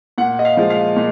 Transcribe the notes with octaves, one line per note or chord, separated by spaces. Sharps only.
A#2 F#5
D#5
F5
F3 G#3
F5
A#2